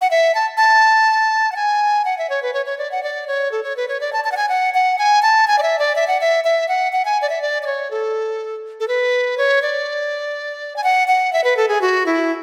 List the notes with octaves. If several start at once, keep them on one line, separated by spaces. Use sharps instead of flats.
F#5
E5
A5
A5
F#5
G#5
F#5
E5
C#5
B4
C#5
C#5
D5
F#5
D5
C#5
A4
C#5
B4
C#5
D5
A5
A5
F#5
G#5
F#5
F#5
G#5
A5
G#5
D5
E5
D5
E5
F#5
E5
E5
F#5
F#5
G#5
D5
E5
D5
D5
C#5
A4
A4
B4
C#5
D5
G#5
F#5
F#5
E5
B4
A4
G#4
F#4
E4